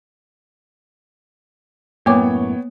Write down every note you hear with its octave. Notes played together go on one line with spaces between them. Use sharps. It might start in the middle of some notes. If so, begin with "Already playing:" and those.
F#2 A2 A#3 B3 C#5 G5 D6